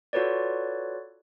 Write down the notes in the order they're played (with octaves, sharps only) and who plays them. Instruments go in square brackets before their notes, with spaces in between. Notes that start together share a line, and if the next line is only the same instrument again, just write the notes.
[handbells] F4 F#4 A4 B4 C#5 D5